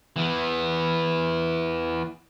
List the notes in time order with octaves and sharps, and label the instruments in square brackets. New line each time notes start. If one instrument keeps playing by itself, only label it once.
[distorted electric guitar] E3 B3